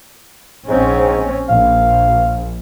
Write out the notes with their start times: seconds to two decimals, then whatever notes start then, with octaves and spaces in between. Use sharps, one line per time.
0.69 A#1 G#2 C4 C#4
1.49 A#1 F5